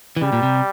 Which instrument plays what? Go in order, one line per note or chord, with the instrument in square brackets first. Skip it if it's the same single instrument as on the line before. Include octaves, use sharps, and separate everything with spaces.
[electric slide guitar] E3
[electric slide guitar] C#3 [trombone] G3
[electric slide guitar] A#2
C3